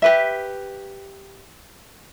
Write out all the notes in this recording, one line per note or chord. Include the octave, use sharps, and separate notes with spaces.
G4 B4 E5